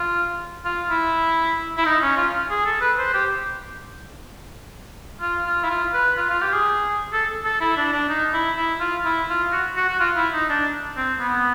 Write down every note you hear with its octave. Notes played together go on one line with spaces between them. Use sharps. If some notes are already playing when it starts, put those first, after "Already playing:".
Already playing: F4
F4
E4
E4
D#4
C#4
F4
G#4
A4
B4
C5
G4
F4
F4
E4
F4
B4
F4
F4
G4
G#4
A4
A4
E4
D4
D4
D#4
E4
E4
F4
E4
F4
F#4
F#4
F#4
F4
E4
D#4
D4
C4
B3